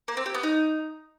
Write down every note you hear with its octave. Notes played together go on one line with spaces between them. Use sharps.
A#3
C4
G4
B3
D#4